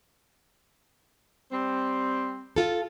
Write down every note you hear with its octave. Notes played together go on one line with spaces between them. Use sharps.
G3 C4
F4 A4